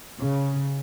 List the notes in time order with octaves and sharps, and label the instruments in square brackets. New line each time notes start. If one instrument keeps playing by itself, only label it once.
[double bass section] C#3